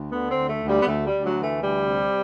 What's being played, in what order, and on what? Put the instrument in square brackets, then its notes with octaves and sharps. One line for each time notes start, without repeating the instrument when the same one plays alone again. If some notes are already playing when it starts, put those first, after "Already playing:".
Already playing: [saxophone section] D2
D3 B3
C4
D2
A3
D2
G3
B3
D2 A3
G3
D2
F#3
E3
A3
D2 G3
C3